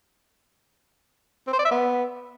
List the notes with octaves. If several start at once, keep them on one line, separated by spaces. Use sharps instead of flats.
C4
C5
D5
E5
B3